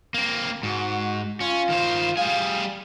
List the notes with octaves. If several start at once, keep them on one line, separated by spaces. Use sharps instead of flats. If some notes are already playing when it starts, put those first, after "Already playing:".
A#3 C4
G#2 F#4
C#4 F4
D#3 C5
G3 G#4 F5